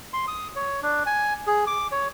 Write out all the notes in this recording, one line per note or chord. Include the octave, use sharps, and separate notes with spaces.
C6
D#6
C#5
D4
G#5
G#4
D6
C#5